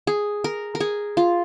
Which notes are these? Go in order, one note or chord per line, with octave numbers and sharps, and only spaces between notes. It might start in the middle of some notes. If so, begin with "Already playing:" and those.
G#4
A#4
A#4
G#4
F4